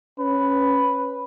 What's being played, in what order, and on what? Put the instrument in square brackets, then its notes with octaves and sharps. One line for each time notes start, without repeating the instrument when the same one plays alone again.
[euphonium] C#4 [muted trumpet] B4